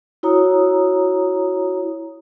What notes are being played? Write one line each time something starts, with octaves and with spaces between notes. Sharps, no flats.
E4 F#4 C#5 A#5 D#6